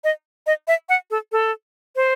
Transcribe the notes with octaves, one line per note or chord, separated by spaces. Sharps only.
D#5
D#5
E5
F#5
A4
A4
C5